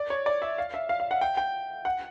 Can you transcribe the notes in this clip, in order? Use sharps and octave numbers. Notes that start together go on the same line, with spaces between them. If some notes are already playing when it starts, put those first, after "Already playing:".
Already playing: D5
C#5
D5
E5
F5
E5
F5
F5
F#5
G5
G5
F#5